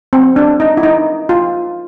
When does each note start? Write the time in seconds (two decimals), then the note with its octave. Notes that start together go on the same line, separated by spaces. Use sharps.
0.13 C4
0.36 D4
0.60 D#4
0.77 E4
0.83 D#4
1.29 F4